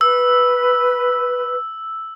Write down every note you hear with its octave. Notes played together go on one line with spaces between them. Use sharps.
B4 E6